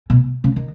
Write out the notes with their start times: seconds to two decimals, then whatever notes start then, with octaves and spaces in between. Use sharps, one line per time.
0.10 B2
0.44 C#3
0.56 D#3